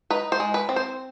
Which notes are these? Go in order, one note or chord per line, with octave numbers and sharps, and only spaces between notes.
D#4 B4
C5
G#3
B4
C4
C5